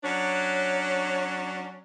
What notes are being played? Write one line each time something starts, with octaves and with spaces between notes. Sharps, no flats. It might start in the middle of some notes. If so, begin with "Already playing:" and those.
F#3 C#4 D4 C#5